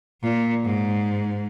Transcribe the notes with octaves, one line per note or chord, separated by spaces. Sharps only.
A#2
G#2